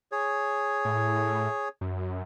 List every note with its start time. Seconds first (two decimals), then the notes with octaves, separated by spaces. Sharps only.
0.12 G#4 C#5
0.85 A2
1.81 F#2